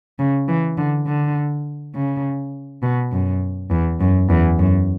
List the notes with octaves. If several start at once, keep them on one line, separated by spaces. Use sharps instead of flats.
C#3
E3
D3
D3
C#3
B2
F#2
E2
F#2
E2
F#2